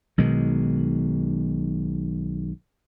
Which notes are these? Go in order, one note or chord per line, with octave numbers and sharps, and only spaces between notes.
B1 B2 D#3 G#3